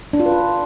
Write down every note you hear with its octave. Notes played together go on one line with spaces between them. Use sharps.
D4
F4
B4
F4